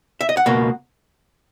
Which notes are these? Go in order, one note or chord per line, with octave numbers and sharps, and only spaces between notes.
E5
D#5
F#5
C#2 B2 A#3